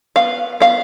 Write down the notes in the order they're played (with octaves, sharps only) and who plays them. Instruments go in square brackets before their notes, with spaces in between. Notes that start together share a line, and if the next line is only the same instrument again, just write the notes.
[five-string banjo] B3 F5
B3 F5